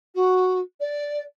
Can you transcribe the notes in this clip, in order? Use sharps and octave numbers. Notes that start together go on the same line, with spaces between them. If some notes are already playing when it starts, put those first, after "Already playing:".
F#4
D5